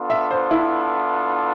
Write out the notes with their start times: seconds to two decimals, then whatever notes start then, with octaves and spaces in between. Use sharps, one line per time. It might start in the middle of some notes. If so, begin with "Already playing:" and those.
Already playing: B3 D4 F4 A4
0.10 E5
0.31 C5
0.51 E4